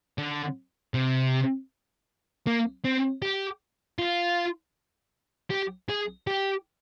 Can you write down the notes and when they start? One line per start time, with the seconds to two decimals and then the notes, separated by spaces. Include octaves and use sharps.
0.18 D3
0.94 C3
2.47 A#3
2.85 C4
3.22 G4
3.99 F4
5.50 G4
5.89 G#4
6.27 G4